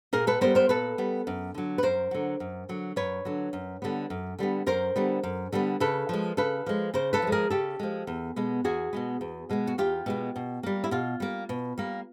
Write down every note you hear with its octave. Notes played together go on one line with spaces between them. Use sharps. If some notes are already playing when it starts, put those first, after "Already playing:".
A#2 G#4 A#4
A4 B4
G3 B3 A#4 C5
A#4 C5
A#2 A4 B4
G3 B3
F#2
D3 F#3
B4
F#2 A#4 C5
D3 F#3
F#2
D3 F#3
F#2 B4 C#5
D3 F#3
F#2
D3 G3 B3
F#2
D3 G3 B3
F#2 A#4 C5
D3 G3 B3
F#2
D3 G3 B3
C#3 A4 B4
F3 G#3
C#3 A4 B4
F3 G#3
C#3 A#4 C5
A4 B4
F3 G#3
G#4 A#4
C#3 G4 A4
F3 G#3
E2
B2 G#3 B3
E2 F#4 G#4
B2 G#3 B3
E2
B2 G#3 B3
F#4
E2 F4 G4
B2 G#3 B3
B2
G3 A#3
E4
B2 F4
G3 A#3
B2
G3 A#3